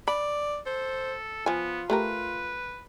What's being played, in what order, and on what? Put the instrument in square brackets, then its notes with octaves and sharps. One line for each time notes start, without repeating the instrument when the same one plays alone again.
[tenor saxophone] D5 [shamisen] B5
[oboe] A4 [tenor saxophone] C5
[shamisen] F3 G#5 [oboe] B3 [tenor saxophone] F4
[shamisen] A3 G4 A#4 [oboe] B4